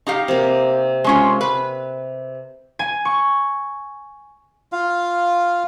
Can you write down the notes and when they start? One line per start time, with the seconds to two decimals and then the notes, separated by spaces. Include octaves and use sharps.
0.07 D#4 G4 F5
0.28 C3 A#3
1.04 G#3 C#4 F4
1.41 B4
2.79 G#5
3.05 C#6
4.72 F4 F5